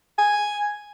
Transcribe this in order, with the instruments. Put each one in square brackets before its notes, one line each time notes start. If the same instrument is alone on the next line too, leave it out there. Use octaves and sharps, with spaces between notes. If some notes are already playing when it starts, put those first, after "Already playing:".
[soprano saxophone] G#5